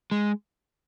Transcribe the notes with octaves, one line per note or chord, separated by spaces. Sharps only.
G#3